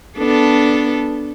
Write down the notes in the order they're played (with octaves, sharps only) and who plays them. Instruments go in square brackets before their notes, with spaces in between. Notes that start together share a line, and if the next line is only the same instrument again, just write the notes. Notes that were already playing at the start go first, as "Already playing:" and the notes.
[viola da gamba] B3 D4 A4